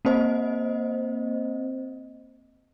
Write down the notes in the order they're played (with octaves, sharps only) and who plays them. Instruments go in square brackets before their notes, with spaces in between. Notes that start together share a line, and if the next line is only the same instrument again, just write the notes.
[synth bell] A#3 C4 C5 D#5